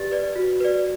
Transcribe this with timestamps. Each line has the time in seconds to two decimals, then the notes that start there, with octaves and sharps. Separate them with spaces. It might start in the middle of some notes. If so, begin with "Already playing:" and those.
Already playing: G4 B4 D5 A6
0.11 B4 D5
0.36 F#4
0.60 B4 D5